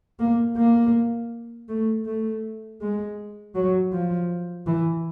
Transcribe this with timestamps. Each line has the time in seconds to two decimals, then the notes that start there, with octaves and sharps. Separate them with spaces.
0.19 A#3
0.57 A#3
1.69 A3
2.06 A3
2.81 G#3
3.55 F#3
3.93 F3
4.67 E3